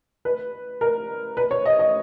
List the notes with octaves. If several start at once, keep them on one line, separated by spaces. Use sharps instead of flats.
B4
A#4
B4
C#5
D#5
D#5